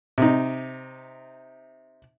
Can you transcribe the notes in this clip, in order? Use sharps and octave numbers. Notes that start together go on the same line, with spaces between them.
C3 D#4